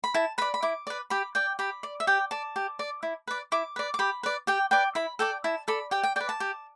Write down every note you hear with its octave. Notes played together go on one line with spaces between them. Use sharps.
B5
E4 A5
B4 D5 B5
B5
E4 D6
B4 D5
G4 B5
D5 G5
G4 B5
D5
E5
G4 G5
D5 A5
G4
D5
E4
B4 D5
E4 D6
B4 D5
D6
G4 B5
B4 D5
G4 G5
B4 D5 G5
E4 B5
A4 D5 G5
E4 A5
A4 D5 B5
G4 G5
G5
B4 D5 G5
A5
G4